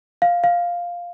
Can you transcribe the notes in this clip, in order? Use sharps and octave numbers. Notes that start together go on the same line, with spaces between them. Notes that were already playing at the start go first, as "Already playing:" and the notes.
F5
F5